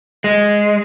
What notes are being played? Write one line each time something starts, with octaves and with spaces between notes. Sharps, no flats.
G#3